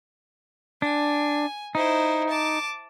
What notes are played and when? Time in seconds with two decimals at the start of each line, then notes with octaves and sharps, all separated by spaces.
0.82 D4 G#5
1.75 D#4 E4 C5
2.29 A5 D6